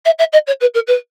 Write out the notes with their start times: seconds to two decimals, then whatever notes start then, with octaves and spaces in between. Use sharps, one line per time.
0.05 E5
0.18 E5
0.32 D#5
0.47 C#5
0.60 B4
0.74 A#4
0.87 B4